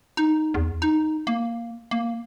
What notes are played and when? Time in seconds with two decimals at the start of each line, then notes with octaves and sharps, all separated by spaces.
0.17 D#4
0.54 E2
0.82 D#4
1.27 A#3
1.91 A#3